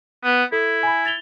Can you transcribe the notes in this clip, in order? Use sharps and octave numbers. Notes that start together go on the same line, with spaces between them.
B3
E4 A4
G#5 B5
A6 F7 G7